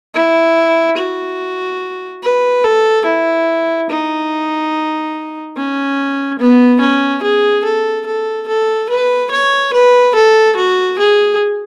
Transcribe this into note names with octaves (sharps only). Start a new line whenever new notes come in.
E4
F#4
B4
A4
E4
D#4
C#4
B3
C#4
G#4
A4
A4
A4
B4
C#5
B4
A4
F#4
G#4